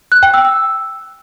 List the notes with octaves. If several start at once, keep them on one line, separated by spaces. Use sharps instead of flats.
F#6
G5
E6
E6